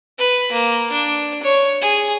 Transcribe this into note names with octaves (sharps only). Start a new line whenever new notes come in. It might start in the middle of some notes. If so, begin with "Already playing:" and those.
B4
A#3
D4
C#5
G#4